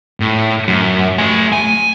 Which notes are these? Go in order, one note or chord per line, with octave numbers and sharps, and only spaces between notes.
A2
F#2
A3 G#5
G#5